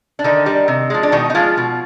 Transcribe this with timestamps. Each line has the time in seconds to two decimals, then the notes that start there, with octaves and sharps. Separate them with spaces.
0.19 D4
0.24 D3 D#3 D#4
0.46 G3
0.68 C3
0.90 F3 G#3
1.03 D4
1.12 B2 D#3 D#4
1.30 D#4
1.35 F3 G#3 F4
1.57 B2